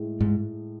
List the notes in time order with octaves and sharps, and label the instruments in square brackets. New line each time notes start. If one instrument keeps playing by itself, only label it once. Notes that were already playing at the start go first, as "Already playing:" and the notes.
Already playing: [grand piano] A2 G#3
[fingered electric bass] G#2